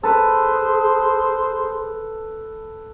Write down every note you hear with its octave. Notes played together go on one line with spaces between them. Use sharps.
G#4 A4 B4 C5